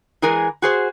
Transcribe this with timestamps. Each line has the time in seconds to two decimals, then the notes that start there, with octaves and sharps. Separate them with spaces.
0.22 E3 G#3 G#4 A#4 G#5
0.62 F#4 G#4 C5